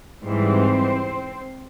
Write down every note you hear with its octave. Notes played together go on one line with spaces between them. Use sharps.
G#2 E3 G3 C4 C5